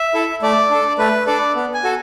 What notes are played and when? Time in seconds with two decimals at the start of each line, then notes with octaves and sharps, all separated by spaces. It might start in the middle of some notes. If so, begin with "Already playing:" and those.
Already playing: E5
0.14 E4 A4
0.43 A3 D5
0.71 D4 A4
0.98 A3 B4
1.26 D4 A4 D5
1.55 B3
1.74 G#5
1.84 F#4 A4